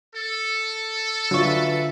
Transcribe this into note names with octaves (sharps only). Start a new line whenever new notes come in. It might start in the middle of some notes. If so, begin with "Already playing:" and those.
A4
D3 F#3 F4 B4 E5 C#6